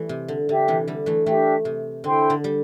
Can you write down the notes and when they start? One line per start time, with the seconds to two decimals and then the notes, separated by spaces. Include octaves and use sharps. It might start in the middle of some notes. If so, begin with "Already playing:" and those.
Already playing: E3 G3 A3
0.09 C3
0.28 D3
0.48 D3 D4 G4 E5 G5
0.68 C3 E3
0.88 D3 G3
1.06 E3 A3
1.26 E3 A3 D4 G4 E5 G5
1.65 C3
2.04 D3 E4 C5 G5 C6
2.30 D3
2.44 G3